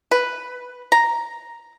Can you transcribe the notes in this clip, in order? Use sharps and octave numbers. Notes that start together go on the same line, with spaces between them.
B4
A#5